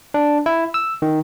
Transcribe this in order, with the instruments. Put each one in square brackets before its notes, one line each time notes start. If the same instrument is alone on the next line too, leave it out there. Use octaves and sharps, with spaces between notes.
[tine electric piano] D4
E4
E6
D#3